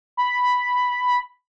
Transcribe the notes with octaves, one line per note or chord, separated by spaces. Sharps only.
B5